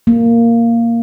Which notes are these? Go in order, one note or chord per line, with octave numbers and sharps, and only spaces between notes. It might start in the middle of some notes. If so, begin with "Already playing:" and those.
A#3